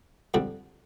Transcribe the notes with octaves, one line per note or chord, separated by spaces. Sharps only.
F2 D3 G3